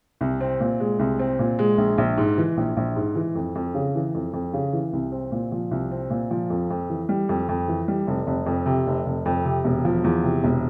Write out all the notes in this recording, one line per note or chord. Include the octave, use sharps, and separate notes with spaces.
C2
C4
A#2
G#3
C2
C4
A#2
G#3
A#1
A#1
G#2
E3
A#1
A#1
G#2
E3
F2
F2
C#3
E3
F2
F2
C#3
E3
C2
C4
A#2
F3
C2
C4
A#2
F3
F2
F2
E3
G3
F2
F2
E3
G3
F1
F1
F2
C3
F1
F1
F2
C3
E1
F3
E2
C3
E1